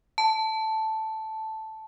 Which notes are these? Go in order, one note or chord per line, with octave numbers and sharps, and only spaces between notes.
A5